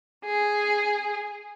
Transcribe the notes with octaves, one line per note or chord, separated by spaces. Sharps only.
G#4